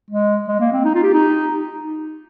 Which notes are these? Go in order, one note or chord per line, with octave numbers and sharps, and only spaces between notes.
G#3
G#3
A#3
C4
D#4
F4
G4
D#4